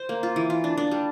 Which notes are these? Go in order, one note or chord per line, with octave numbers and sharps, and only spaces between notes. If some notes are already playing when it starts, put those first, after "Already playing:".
Already playing: C5
A#3
F4
E3
F4
D4
D4
G3